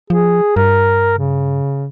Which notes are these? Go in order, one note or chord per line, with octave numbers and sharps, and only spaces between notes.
F3 G#4
G2 A#4
C#3